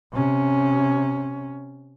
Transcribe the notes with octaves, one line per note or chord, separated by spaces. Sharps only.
C3 C#4